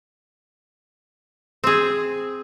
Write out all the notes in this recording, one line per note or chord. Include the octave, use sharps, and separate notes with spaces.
C4 G#4